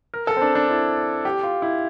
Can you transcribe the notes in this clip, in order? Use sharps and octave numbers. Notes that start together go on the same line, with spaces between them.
A#4
A4
C4
D4
D4
E4
G4
F4
E4